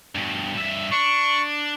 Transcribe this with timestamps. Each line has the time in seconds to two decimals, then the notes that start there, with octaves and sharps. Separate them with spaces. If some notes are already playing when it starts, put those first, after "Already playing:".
0.15 G2 B2
0.55 G2 E5
0.92 D4 C#6